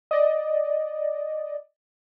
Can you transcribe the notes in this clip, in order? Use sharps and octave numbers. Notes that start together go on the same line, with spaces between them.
D5 D#5